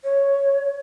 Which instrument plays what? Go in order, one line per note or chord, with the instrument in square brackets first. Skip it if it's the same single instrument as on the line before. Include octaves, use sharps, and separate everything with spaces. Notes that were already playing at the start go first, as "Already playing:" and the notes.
[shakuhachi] C#5